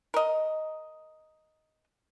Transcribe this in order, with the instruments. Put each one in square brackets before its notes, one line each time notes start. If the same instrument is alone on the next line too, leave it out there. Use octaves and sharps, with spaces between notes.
[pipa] A#4 D#5